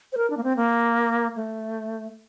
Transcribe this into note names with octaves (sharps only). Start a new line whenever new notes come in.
C5
A#4
D4
A#3
C4
A#3
A3